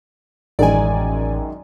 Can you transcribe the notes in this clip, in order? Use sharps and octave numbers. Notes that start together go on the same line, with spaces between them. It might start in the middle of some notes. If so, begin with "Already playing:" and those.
A1 F#2 D#3 G#3 D5 G#5